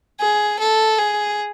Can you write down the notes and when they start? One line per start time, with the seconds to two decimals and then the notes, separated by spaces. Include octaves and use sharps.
0.20 G#4
0.59 A4
0.99 G#4